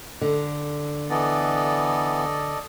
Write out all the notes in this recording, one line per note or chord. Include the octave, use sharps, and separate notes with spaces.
D3
E3 B3 A4 D5 D#5